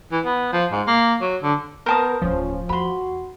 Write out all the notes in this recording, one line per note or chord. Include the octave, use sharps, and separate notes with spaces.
E3
B3
F3
G#2
A#3
F#3
D3
B3 A#4 C5 A5 D#6
D1 E2 F3 C#4
E2 F#4 B5 C6